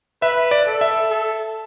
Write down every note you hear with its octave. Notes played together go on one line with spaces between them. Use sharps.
B4 E5
D5
A4
E5
A4